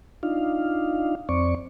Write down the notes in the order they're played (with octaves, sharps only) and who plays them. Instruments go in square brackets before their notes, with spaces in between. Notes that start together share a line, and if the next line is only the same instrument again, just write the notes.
[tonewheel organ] D4 D#4 F4 F5
F2 C4 D5 C#6